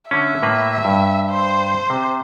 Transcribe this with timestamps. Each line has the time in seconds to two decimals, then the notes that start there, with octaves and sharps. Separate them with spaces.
0.11 D3 C#4 E5
0.43 A2 A#3 B4
0.85 G2
1.30 C5
1.90 C3